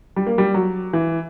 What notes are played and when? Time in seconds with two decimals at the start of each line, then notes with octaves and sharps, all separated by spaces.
0.16 G3
0.26 A#3
0.38 G3
0.54 F#3
0.93 E3